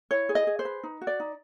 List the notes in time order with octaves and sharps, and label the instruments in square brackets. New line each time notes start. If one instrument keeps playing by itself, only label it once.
[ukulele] E4 C#5
G#4
D#5
G#4
C5
B4
D#4
F#4
D5
D#4